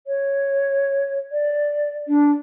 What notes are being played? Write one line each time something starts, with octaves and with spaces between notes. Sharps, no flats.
C#5
D5
D4